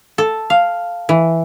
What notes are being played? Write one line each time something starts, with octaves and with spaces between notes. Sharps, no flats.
A4
F5
E3